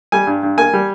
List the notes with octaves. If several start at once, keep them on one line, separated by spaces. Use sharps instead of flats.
G3 G#5
G2
G2
A#3 G#5
G3